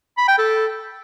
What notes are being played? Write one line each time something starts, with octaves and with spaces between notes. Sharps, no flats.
B5
G5
A4